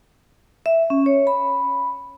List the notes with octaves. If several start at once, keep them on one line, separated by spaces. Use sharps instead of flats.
E5
C#4
C#5
B5